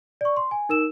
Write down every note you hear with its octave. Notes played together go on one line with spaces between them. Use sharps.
D5 C#6
C6
G#5
D#4 A#4 E6 E7